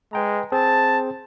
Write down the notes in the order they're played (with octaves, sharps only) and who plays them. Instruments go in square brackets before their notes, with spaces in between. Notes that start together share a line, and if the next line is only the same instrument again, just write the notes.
[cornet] G#3 [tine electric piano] B4 G5 A#5
[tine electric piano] C4 G#4 C5 [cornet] A5